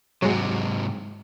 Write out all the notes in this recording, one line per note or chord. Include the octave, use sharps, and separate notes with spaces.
G#2 C3 F#3 G#3